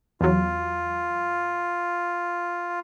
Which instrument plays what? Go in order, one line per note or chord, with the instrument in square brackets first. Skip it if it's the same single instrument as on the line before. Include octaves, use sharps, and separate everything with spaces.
[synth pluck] E2 F#3 [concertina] F4